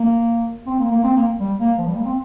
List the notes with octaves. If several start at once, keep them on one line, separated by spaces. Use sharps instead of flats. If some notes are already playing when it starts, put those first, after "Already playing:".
Already playing: A#3
C4
A#3
A#3
C4
A#3
G3
A#3
F3
G3
A#3
C4